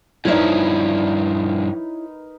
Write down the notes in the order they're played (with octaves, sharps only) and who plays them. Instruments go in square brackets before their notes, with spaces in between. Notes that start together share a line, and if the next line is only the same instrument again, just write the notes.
[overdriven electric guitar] G2 F3 [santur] D#4 A#4 B4 [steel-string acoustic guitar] E4 C#5 E5